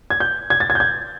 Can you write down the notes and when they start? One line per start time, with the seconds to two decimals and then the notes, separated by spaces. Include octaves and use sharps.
0.10 G#6
0.20 G6
0.50 G#6
0.60 A6
0.70 G#6
0.75 G6
0.80 G#6